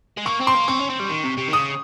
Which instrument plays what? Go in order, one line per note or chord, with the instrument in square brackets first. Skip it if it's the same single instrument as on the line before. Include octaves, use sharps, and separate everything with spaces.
[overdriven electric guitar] G#3
[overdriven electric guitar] A#3 [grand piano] C#6
[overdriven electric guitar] C4
[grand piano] C6
[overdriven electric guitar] A#3
[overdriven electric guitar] C4 [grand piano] C#6
[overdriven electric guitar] C#4
C4
G3
D#3
C3
C3
D#3
[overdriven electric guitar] C#3 [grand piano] D#6